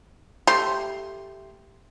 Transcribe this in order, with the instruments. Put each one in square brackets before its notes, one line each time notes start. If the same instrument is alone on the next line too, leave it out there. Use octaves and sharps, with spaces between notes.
[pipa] A3 G4 C6